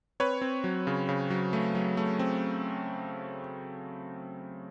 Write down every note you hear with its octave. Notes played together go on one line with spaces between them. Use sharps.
C4 B4 C#5
C4
F#3
C#3
C#3
F#3
A3
F#3
A3
C4